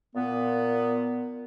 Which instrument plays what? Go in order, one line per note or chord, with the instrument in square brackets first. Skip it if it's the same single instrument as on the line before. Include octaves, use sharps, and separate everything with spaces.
[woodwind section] A#2 B3